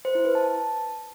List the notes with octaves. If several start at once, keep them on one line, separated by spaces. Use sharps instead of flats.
C5
E4
B4
A5
A5